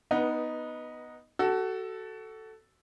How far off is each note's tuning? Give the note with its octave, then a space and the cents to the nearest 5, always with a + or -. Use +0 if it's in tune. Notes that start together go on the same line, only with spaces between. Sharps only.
B3 +0 D#4 +0 B4 -20
F#4 +25 A4 +0